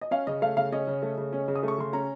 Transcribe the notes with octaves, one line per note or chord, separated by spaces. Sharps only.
D#5
C#4 F5
C#3 D#5
A3 F5
C#3 F5
C#4 D#5
C#3
A3
C#3
C#4
C#3
D#6
A3 C#6
C#3 C6
C#4 A#5